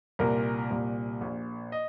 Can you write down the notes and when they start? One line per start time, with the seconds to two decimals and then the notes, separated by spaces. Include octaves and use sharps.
0.19 C2 A#2 A#4
0.70 C2 A#2
1.21 A#1 A#2
1.72 D#5